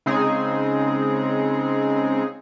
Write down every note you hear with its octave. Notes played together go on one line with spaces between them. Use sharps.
C#3 G#3 C4 D#4 G#4